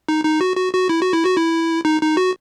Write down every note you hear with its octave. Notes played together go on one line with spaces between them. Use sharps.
D#4
D#4
F#4
F#4
F#4
E4
F#4
E4
F#4
E4
D#4
D#4
F#4